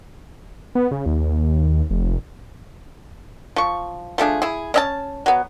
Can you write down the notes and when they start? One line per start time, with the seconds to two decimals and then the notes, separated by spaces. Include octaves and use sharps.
0.75 B3
0.91 C#3
1.06 D#2
1.91 F1
3.56 F3 C#6
4.18 F3 A3 D4 G#4
4.42 E4 G#4
4.74 C#4 D#5 A5
5.26 F#3 B3